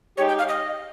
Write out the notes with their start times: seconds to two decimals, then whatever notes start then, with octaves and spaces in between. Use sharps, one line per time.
0.17 G#3 D#4 G4 C#5
0.29 G5
0.39 F5
0.49 D#5